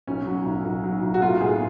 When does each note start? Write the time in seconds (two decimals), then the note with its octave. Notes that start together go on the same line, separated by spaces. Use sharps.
0.07 B1 C#4
0.26 F#3
0.46 B1
0.65 B1
0.84 F#3
1.02 B1
1.14 F#4
1.22 A2 F4
1.41 A2 G#4